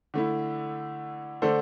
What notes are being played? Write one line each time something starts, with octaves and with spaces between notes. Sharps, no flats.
D3 A3 E4
D3 A3 D4 A4 C5